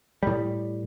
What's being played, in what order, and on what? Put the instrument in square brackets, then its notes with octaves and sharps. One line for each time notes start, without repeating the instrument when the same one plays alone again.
[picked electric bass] A2 G3